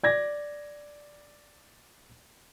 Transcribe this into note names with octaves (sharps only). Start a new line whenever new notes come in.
D5 G#6 A#6